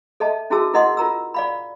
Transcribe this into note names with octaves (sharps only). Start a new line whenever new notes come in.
A4 D#5 E5 A5
C#4 E4 F#4 G#4 A5 E6
E4 A#4 D#5 F#5 C6 D#6
F4 A#4 A#5 E6
D5 F5 B5